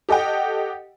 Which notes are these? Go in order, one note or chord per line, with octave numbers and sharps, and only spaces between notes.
G4 A4 D#5 F#5 G5